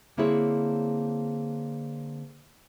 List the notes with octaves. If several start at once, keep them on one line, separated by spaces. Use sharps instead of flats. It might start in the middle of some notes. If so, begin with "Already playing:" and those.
D3 A#3 C4 E4 G#4 C#5